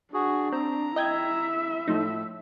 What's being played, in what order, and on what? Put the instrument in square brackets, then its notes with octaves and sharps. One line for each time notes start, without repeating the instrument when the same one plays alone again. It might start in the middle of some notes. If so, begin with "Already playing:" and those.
[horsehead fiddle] D4 [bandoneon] F#4 G#4
[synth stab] C4 [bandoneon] A#5
[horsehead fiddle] E4 E5 [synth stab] D#5 G5 G#6
[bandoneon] A2 [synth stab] F3 A3 D#4